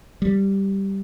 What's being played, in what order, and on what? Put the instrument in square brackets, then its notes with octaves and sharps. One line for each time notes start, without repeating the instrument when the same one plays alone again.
[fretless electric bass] G3